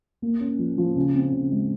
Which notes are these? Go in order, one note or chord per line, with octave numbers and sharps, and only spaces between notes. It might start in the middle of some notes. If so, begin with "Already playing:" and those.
A#3
C#4
F3
F3
C#3
C4
C#3
G#3